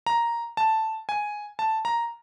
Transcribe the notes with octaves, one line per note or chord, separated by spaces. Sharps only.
A#5
A5
G#5
A5
A#5